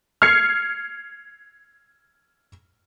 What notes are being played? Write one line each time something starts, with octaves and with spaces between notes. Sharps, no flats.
F6 G#6 C7 C#7